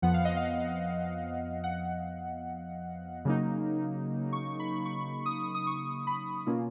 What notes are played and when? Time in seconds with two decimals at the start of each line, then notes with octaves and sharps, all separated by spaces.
0.02 F2 F3 B3 F#5
0.14 F5
0.25 D#5
0.37 F5
1.64 F#5
3.25 C#3 F#3 A#3 D#4
4.33 C#6
4.60 B5
4.86 C#6
5.26 D#6
5.55 D#6
5.67 C#6
6.07 B5
6.46 B2 A#3 C#4 F4